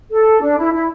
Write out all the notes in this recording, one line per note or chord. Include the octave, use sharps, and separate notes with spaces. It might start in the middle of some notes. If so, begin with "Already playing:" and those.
A4
D4
E4
E4